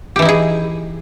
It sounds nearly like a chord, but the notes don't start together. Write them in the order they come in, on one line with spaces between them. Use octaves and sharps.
G4 E3 E4 D#4 G#4